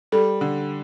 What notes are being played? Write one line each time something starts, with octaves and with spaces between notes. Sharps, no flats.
G3 A4
D3